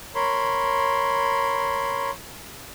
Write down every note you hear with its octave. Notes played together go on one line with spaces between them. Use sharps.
A#4 C#5 B5 C6